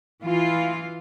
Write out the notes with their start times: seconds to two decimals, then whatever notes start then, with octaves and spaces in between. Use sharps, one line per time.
0.22 E3 F4